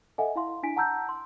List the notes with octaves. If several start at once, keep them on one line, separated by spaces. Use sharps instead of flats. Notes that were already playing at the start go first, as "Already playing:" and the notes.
A4 D#5 E5 F#5 G#5
E4 F5 C6
D4 E4 G#5 B6 D7
F#5 A5 A#5 E6 G6
C6